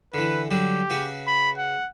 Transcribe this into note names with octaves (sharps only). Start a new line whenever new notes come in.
D3 E3 B4
D3 F#3 G3 G4
C#3 F#4 B4
B5
F#5